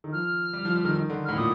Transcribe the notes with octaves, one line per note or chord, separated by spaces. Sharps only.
D#3
F3 F6
G3
F3
G3
D#3
D#3
D3
A2 F6
A#2 D#6